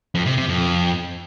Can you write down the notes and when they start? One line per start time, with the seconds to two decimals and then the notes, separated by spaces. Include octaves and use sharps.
0.15 F2
0.26 C3
0.37 C3
0.49 F2